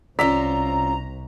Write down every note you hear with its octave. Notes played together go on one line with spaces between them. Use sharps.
C2 C#4 F4 C5 D5 A#5 E6 B6